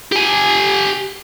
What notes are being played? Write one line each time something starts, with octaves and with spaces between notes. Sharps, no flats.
G4 G#5